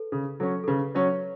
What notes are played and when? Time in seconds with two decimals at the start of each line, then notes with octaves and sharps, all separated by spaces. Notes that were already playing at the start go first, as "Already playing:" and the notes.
Already playing: A4 B4
0.12 C#3
0.40 F#3 C#4 A4
0.64 A4
0.68 C#3 B4
0.95 F#3 C#4 C#5